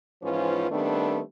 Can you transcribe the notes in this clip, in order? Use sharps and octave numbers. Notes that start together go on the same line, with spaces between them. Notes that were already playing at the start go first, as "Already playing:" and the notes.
G#2 E3 F3 C#4 F4 B4
D#3 G3 A3 B3 C4 D4